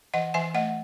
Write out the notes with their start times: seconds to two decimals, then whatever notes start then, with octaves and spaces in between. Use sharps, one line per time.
0.14 E3 D#5 F#5
0.34 E3 E5 G#5
0.54 A3 D#5 F#5